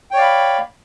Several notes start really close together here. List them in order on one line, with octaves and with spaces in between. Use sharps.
G5 C#5 D5 F5 B5